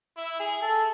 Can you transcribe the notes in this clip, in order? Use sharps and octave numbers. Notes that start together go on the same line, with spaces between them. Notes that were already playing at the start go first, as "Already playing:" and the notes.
E4
G#4
A4